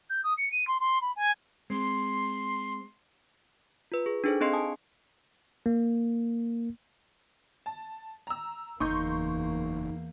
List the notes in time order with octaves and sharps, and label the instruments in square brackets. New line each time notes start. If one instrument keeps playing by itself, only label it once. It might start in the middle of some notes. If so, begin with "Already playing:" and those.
[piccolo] G6
D#6
C#7
D#7
C6
C6
B5
G#5
[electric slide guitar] G#3 C4 [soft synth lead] C6
[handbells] F4 B4
G#4
D4 D#4 G#4 A4 C5
C4 D4 G#4 D#5 C6 C7
G#5 A5 D#6
[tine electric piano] A#3
[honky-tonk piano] A5
A#5 E6
[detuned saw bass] F#1 [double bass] E2 A#3 [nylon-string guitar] D#4 [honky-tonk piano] C6 C#6 G6